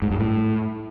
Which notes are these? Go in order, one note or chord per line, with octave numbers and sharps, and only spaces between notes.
G#2
G2
A2